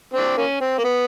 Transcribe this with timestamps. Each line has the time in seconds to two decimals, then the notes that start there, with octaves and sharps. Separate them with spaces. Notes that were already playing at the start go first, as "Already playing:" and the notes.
0.14 C4 D4
0.37 A#3 C#4
0.60 C4
0.78 A#3
0.84 B3